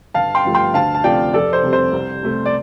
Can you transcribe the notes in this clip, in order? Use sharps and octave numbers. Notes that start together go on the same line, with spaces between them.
G1 F5 A5
G5 C6
G2 F3 A3
G5 C6
D2 F5 A5
A5
C3 F3 A3 D5 G5
F1 A4 D5
C5
F2 C3 G3
C5
C2
C3 A3
D5